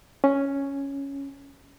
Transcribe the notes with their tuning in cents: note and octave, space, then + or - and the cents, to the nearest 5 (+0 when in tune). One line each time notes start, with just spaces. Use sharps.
C#4 +0